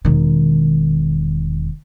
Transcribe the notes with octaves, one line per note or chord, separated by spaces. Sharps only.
E1 D#3